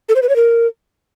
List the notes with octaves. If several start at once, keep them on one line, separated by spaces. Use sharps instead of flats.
A4
C5
B4
C#5
A#4